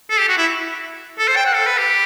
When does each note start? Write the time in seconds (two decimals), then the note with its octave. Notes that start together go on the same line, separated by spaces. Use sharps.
0.10 A4
0.19 G4
0.29 F#4
0.38 E4
1.18 A4
1.28 C5
1.36 G5
1.45 F#5
1.54 A4
1.67 B4
1.78 G4